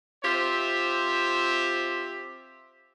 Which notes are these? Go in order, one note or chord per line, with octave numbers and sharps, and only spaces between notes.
C4 F4 G4 C5 E5